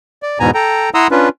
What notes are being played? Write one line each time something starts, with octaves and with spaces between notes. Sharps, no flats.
D5
E2 G#2 B2 B3 G#5 A#5
A4 G5 A#5
E4 F#5 A#5 C6 D#6 E6
C#4 D4 F4 B4